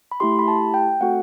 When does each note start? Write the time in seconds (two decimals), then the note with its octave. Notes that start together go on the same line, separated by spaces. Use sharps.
0.12 B5
0.20 A3 E4 G4 C6
0.39 B5
0.48 A5
0.74 G5
1.01 A3 C4 F#4 A4 F#5